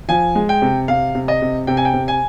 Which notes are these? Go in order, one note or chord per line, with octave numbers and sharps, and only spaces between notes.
F3 G#5
G#3
G5
C3
C3 F5
C3
D#5
C3
C3 G5
G#5
G5
C3
G#5